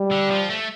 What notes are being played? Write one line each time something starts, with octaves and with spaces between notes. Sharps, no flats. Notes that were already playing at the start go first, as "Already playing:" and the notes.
Already playing: G3
D3
F3
A3